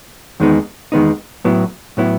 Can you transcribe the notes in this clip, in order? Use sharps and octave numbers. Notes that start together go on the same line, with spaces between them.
E2 D#3 G#3 B3 D#4
E2 D#3 G#3 B3 D#4
A2 F#3 B3 E4
A2 F#3 B3 E4